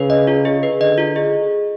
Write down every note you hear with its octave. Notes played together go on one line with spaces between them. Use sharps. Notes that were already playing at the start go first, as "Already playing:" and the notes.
Already playing: C#3 B4
D#5
F4
G#4
B4
D3 D#5
F4
G#4